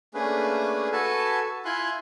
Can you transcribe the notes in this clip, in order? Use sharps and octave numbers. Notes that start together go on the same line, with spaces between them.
A3 A#3 C#4 D4 G#4 B4
F#4 A4 B4 G#5 A5
E4 F4 G#5 C6 F#6